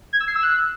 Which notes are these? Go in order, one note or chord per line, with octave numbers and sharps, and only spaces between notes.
G#6
E6
C7
E6
F#6